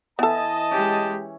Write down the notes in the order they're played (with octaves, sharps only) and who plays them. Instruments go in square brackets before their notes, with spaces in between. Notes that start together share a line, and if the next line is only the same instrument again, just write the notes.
[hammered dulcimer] E3 E4 [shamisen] B3 A4 [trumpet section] D#5 A5
[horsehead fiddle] G#3 G4 [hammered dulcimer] C#4